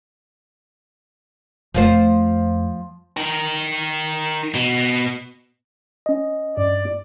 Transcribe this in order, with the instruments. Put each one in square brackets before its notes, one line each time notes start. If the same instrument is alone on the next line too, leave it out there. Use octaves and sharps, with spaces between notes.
[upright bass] F2 A3 [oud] F3 F4 C5
[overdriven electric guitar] D#3 A#4
B2
[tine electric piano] C#4 D#5
[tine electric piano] G2 [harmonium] D5